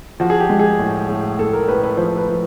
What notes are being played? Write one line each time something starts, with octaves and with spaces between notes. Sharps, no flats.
F3 F#4
G#4
G4
G#3
G#4
A2
A2
A2 A4
A#4
A2 B4
B4
F3 C5
B4
F3